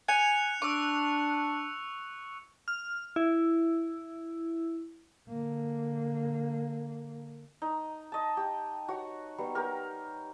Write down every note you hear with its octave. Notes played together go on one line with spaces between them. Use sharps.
G#5 F#6 C#7 F7
D4 C#6 D6 E6
F6
E4
D3 A#3
D#4
D#5 A5
G4
F#4 C#5
F#3 G3 B3
G4 A#4